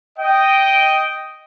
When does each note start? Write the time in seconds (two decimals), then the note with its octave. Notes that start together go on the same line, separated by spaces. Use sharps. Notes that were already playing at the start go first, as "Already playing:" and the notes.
0.18 D#5 G5